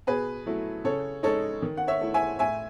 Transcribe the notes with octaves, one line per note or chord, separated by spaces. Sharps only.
B2 G#4 B4
F#3 A3 E4
C#3 A4 C#5
G#3 D#4 A4 C#5
D#3
F#5
C#5 E5
A3 E4
E5 G#5
A2 E5 G#5